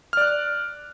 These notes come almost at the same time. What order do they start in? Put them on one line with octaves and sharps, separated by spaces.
F6 D5 F#6